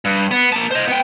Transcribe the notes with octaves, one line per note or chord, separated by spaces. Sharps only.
G2
B3
A#3 A5
C5 D#5
B3 G5